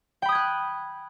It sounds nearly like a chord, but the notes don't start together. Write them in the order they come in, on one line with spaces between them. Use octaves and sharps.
G5 B5 D#6 G#6 F#6